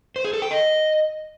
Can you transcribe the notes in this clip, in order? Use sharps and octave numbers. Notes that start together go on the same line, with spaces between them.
C5
G#4
A4
G5
D#5